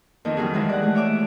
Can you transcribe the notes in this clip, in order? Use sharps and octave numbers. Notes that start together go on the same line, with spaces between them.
F2 D#3 A#3 D#4
D#3 F#3 G3 F#4 G#4
D#2 E3 G#3
D5 F#5
G#3 A3
C#5 E5 D6